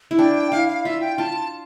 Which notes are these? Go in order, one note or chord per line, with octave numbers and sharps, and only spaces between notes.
E4
D4 G5
E4 F5
F5
F4 E5
G5
F4 A5